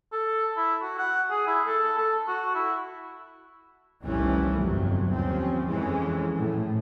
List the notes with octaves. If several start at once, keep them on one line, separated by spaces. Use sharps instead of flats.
A4
E4
F#4
F#5
G#4
E4
A4
A4
F#4
E4
F1 C2 D#3 E3 A3 C#4
G1 F2 C3 F#3
D#2 F3 C4 C#4
F2 E3 G#3 C#4
A2